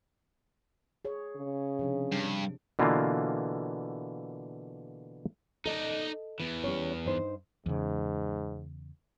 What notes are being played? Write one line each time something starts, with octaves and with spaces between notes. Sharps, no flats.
G#4 C#5
C#3
C3 F3 D4
G2
B2 D3 E3 A#3 F4
D#4 A4 D5 D#5
E2 E3
G3 C#4 C#5
G2 D#4 C5
E2 G#2 C#3